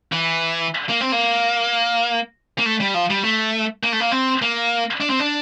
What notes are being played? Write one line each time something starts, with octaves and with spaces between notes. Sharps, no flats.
E3
A#3
C4
A#3
A#3
A3
G3
F3
G3
A3
A#3
A3
A#3
C4
A#3
D4
C4
D4